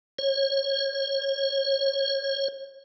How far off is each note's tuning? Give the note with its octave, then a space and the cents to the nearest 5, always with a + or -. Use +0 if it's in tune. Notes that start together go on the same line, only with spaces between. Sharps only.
C#5 -30